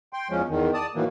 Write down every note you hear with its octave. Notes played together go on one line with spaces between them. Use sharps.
G5 C6
E2 F3 G#3 C#4
E2 D#3
D5 A5 D#6
A2 D#3 E3 F#3 A#3